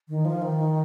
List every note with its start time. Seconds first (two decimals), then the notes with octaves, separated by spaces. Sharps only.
0.09 D#3
0.25 F3
0.42 D#3